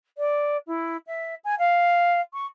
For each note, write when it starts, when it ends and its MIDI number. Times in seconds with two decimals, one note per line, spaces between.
0.17 0.57 74
0.67 0.97 64
1.07 1.34 76
1.44 1.54 80
1.58 2.20 77
2.33 2.46 85